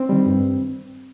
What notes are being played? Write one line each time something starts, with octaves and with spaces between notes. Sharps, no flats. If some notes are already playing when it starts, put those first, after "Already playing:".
Already playing: C4
D#3 G3
G2